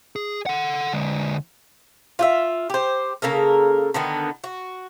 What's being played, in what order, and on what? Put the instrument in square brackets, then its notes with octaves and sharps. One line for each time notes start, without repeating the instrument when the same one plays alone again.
[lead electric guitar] G#4
A4 F#5
D3 G#3
[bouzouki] F4 F#4 E5
G4 C5
C#3 A#3 A4 A#4
D3 D#3 B3
F#4